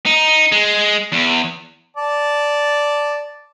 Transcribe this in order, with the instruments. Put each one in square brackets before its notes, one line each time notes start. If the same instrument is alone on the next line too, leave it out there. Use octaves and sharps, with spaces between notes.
[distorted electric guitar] D#4
G#3
E2
[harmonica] D5 A5